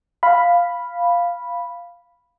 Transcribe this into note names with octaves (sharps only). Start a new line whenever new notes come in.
F5 B5